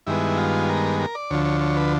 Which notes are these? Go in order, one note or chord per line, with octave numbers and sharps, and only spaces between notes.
G2 D#3 G#3 B3 E4
F4
A#4
A#4
D5
D2 D3 F3 C#5
C#5
C#5
B4